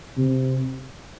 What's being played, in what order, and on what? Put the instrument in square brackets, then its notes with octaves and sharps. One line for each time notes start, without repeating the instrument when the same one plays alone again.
[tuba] C3